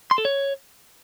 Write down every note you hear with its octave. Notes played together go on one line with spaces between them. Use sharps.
C6
A4
C#5